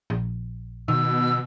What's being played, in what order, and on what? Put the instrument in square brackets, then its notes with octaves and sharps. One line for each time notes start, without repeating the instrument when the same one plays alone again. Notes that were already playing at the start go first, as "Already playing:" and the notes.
[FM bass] A#1
[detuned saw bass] B2 [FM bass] D#3 [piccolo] E6